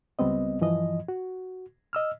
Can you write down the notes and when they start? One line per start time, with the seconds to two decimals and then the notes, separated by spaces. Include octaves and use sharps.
0.19 C#2 G3 B3 C4 D#5
0.61 G2 E3 F3 D#5
1.08 F#4
1.93 D#5 E6 F6